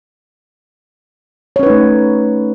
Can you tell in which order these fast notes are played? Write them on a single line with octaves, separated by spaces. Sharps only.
C#5 C#4 B4 D#4 A3